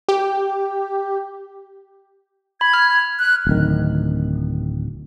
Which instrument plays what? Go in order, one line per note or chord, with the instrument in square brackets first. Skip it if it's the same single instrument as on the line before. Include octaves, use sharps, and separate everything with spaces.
[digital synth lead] G4
[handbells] B5 [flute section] G#6
[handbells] F6
[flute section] F#6
[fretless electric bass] D1 D#3